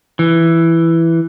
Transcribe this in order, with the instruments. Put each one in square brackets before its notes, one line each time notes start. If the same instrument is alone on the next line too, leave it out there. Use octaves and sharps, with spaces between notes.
[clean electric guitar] E3